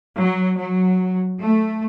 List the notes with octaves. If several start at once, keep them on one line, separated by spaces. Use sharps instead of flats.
F#3
F#3
A3